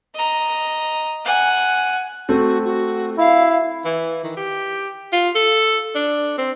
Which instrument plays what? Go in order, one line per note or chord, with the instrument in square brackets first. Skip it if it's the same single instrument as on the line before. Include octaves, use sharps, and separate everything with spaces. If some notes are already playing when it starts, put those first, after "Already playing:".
[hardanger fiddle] D#5 A#5
F#5 G#5
[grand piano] A3 C4 [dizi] F#4
[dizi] F#4
[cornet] E4 [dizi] F5
[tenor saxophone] E3
D#3
G4
F4
A4
D4
C4